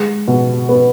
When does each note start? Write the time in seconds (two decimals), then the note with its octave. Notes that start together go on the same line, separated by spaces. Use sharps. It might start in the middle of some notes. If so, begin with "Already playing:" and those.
Already playing: G#3
0.28 B2
0.69 B3